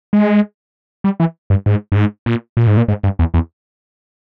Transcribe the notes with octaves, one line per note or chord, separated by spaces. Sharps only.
G#3
G3
E3
G2
G#2
G2
G#2
A#2
A#2
G#2
A#2
G#2
G2
E2
E2